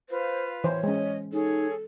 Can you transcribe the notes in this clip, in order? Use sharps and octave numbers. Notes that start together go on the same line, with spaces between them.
F4 B4 C5 F5
E3 C5 C#5
G#3 C#4 D#5
D#4 G#4 A4 C#5